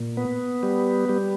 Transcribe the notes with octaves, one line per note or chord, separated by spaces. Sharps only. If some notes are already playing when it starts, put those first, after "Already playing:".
Already playing: A#2
B3
G3
G3